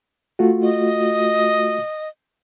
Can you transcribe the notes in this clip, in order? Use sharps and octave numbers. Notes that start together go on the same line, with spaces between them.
A3 F4 F#4
D#5